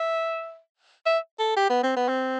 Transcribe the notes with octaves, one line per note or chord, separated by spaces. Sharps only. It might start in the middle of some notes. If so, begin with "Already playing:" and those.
Already playing: E5
E5
A4
G4
B3
C4
B3
C4